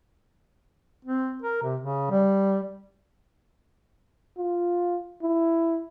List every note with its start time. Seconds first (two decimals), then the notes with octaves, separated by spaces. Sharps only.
1.05 C4
1.42 A#4
1.63 C3
1.81 C#3
2.11 G3
4.37 F4
5.22 E4